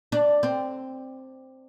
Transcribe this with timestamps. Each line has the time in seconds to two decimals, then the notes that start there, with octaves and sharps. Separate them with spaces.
0.12 D4
0.43 C4